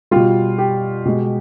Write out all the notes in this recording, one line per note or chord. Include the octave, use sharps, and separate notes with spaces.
B2 G3 F4
G4
B2 G#3